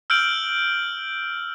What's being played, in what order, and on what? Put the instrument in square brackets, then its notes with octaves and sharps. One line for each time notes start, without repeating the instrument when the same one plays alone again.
[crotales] E6 F6 G6 D7 F#7